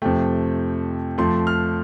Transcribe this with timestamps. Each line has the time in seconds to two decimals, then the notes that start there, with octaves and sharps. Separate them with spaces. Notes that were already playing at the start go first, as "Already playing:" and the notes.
0.02 F2 C3 A3 G5
1.18 F2 F3 A3 C6
1.47 F6